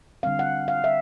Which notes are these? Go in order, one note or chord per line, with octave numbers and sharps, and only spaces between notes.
D3 G3 C4 F5
F#5
F5
E5